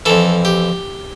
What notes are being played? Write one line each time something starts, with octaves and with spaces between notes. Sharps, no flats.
F2 E3 A4
G4